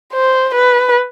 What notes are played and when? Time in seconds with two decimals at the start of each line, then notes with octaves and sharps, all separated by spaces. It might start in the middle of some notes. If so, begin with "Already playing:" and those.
0.13 C5
0.55 B4